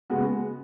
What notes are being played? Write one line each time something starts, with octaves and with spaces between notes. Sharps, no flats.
C#3 G#3 B3 F#4